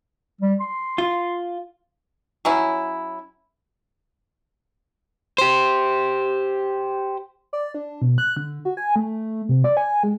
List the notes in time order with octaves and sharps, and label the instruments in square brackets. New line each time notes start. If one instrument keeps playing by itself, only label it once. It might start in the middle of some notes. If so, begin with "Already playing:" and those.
[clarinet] G3
C6
[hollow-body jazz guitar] F4
[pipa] F#3 C#4 E4
[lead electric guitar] G4 C5
[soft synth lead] D5
D4
B2
F#6
D3
F#4
G#5
A3
C3
D5
G#5
G#3